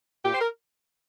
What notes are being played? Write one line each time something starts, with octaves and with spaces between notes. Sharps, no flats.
A#2 G4
C5
A#4